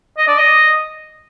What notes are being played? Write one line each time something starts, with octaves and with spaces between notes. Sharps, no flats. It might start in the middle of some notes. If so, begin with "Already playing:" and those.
D#5
D5
D#5